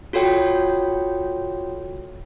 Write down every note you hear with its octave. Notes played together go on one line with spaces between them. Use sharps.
F4 F#4 A4 C#5 G5